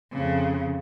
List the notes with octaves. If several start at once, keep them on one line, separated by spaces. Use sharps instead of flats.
F2 C#3